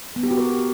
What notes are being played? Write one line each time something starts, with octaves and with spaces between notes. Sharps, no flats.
B3
G4
F#4
A#4